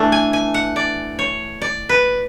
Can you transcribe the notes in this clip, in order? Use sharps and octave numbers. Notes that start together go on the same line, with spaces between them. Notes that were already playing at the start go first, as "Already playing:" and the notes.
Already playing: E3 A3 D4
G#5
G#5
F#5
D5
C#5
D5
B4